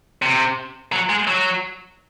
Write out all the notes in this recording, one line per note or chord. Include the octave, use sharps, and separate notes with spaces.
C3
F#3
G#3
F#3